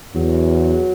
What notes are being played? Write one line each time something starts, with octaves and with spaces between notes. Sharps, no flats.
E2 F#3